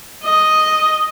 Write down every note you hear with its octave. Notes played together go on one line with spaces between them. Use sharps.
D#5